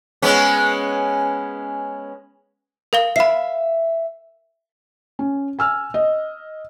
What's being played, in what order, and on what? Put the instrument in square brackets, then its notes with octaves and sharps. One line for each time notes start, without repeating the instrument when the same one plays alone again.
[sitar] G#3 B3 C#4
[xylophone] A#4 F5 G7
[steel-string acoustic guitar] E5 F5 [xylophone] B5 C7
[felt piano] C#4
G#5 E6 F6
D#5